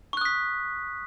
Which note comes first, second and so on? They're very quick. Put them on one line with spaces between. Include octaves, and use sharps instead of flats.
C#6 F#6 D#6 B6